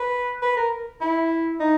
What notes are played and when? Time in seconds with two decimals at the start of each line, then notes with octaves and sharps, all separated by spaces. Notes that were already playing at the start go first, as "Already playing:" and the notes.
Already playing: B4
0.42 B4
0.57 A#4
1.01 E4
1.60 D#4